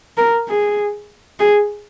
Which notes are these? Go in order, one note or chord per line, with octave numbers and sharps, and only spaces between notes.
A#4
G#4
G#4